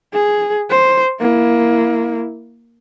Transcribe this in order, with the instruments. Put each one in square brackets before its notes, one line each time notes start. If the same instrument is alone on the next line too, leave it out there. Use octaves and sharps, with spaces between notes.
[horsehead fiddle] G#4
C5
A#3 E4